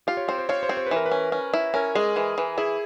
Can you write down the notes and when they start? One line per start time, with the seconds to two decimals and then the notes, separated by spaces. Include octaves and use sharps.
0.07 F4 G4
0.17 C#5
0.28 C4 C5
0.38 C5
0.49 F4 C#5
0.63 C5
0.69 C4
0.77 C5
0.87 B4
0.91 E3 A#4
1.06 B4
1.11 C#4
1.32 C#4
1.54 E4
1.74 C#4 A#4
1.95 G#3 G#4
2.16 E3
2.38 E3
2.58 E4 G#4